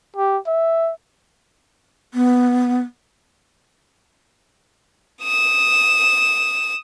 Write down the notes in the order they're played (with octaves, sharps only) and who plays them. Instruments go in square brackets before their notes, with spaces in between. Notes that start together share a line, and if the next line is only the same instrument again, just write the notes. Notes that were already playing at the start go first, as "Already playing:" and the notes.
[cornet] G4
E5
[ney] B3
[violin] D#6 E7